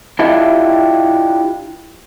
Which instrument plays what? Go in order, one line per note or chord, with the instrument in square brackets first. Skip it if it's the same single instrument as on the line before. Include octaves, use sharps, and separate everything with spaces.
[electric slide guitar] D4 E4 F4 G4 D#5 E5